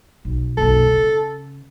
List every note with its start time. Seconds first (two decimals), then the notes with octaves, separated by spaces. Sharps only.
0.25 B1
0.57 F#1 B1 A4
0.87 C#3